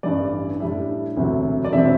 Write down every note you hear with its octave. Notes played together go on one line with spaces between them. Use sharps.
A1 G2 E3 G3 D5
A2 G3 D4 E5
E1 D2 C3 F#3
D5
E1 C3 F#3 C4 E5